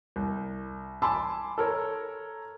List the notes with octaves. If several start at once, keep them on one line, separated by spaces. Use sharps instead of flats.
C2
G#5 A5 B5 C6 D6 E6
A4 A#4 C#5